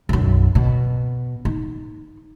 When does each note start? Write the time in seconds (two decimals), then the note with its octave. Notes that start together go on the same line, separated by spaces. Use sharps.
0.09 B1 F#2
0.55 B2
1.45 D#4